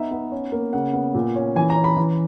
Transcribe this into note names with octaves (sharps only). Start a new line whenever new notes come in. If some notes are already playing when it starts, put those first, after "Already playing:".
Already playing: B3 D#4 E5
B3
C#4
A#3
C#3 F#5
B3
A#2
C#4
E3 G#5
A#5
C#4
B5
E3